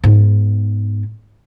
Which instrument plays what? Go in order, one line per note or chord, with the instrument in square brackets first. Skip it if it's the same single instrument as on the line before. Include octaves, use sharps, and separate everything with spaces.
[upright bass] G#2 B3